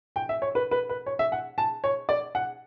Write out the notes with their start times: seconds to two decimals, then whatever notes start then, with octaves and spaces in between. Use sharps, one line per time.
0.16 G5
0.29 E5
0.42 C#5
0.55 B4
0.71 B4
0.89 B4
1.06 C#5
1.19 E5
1.32 F#5
1.58 A5
1.84 C#5
2.09 D5
2.35 F#5